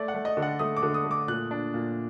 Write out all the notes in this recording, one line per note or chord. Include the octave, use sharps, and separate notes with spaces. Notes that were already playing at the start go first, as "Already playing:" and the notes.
Already playing: A3 D5
F#5
A3
D#5
D3
F#5
A3 D#6
D6
D3
D#6
A3
D6
A#2 F#6
D4
A#2